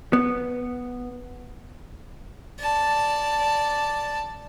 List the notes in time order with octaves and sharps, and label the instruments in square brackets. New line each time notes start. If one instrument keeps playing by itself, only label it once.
[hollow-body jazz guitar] B3
[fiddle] D5 A5